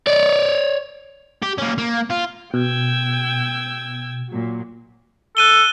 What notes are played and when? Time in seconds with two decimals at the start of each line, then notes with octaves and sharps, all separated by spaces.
0.07 C#5 D5
1.43 G4
1.58 A#3 C#4
1.78 A#3
2.10 F4
2.54 B2 G5 E6 G#6
4.28 A#2 F#3
5.37 A4 F#6 D#7 G7